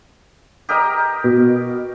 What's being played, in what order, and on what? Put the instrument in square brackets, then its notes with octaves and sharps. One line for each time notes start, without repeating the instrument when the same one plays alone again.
[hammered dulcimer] G4 A#4 D#5
[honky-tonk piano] B2